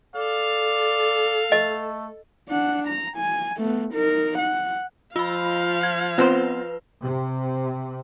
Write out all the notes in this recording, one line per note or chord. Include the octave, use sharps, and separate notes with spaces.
A4 D5 F5
A3 D#5
D4 F#5
A#5
G#5
A3 B3
D#4 A#4
F#5
F3 F4 F5 B5
G#6
B3 C4 F4 B4 C5
C3